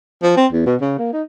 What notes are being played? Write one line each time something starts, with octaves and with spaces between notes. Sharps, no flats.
F3
C4
E2
B2
C#3
A#3
D#4